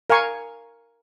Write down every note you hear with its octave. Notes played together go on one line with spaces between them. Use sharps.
A#4 F5 G#5 C#6